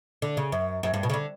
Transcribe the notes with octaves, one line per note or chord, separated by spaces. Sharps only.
D3
C#3
F#2
F#2
G2
B2
C#3
D3